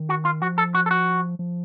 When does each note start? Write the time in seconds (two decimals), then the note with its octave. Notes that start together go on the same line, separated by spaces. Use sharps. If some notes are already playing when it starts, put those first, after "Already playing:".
Already playing: D#3
0.09 F#4
0.25 F4
0.42 F3 F#4
0.58 A4
0.75 F#4
0.86 A4
0.91 F#4
1.39 F3